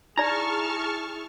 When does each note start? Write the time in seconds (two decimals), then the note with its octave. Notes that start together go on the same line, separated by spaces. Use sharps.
0.18 D#4 E4 G#4 D5 A5 A#5 C#6 F6